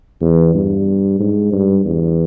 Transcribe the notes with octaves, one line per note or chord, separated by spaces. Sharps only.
E2
G2
G#2
G2
E2